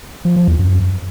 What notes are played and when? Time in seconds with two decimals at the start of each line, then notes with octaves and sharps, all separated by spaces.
0.25 F3
0.36 F3
0.48 E2
0.59 F#2